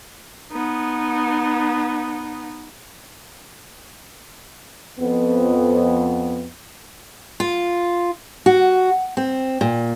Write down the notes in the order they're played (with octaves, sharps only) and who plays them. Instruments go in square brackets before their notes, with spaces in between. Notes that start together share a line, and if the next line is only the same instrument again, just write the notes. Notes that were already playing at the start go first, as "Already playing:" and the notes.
[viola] B3 D#4
[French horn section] F2 B3
[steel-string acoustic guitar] F4
F#4
C4
A#2